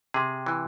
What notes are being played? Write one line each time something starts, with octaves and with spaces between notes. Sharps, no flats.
C3 G#4
E3